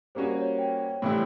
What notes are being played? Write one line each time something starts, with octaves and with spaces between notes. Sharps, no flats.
G3 A#3 C#4 F#4 C5
C#5
G5
A2 E3 G3 C4 E4